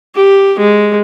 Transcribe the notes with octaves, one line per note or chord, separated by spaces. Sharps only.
G4
G#3